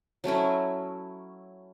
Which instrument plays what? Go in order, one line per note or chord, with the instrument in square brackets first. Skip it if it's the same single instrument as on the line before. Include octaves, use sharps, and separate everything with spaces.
[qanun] F#3 A3 C#4 E4